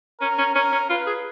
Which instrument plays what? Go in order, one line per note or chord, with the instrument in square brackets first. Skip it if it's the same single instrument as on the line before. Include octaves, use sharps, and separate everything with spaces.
[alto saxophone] C#4 [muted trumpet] A#4
[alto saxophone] C#4
[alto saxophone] C#4 [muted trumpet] A#4
[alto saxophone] C#4
[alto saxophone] F4 [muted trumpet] B4
[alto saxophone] G#4